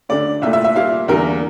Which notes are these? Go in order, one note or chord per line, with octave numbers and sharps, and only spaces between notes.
D2 D3 A3 D5
C2 A#2 A3 E5
E5
E5
A#2 G3 A#3 F5
E2 D3 G3 A#3 A#4